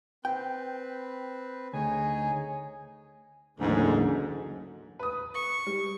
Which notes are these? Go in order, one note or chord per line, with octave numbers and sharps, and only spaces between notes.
C4 B4 G5
D2 D#4 G#4 C#5 G#5
F#1 D2 G#2 D3 E3 F#3
B4 D#6
C#6
G3